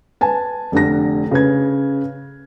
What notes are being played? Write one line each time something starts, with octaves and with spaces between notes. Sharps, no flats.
B4 G#5 A5
F1 D3 A#6
C#3 B4 G#6